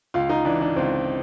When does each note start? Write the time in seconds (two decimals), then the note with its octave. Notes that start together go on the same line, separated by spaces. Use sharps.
0.14 C#2 F4
0.29 D#4
0.45 E3 D4
0.61 D4
0.76 C#2 C4